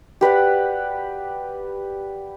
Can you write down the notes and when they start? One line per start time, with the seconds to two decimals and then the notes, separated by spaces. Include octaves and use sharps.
0.21 G4 B4 D5 F#5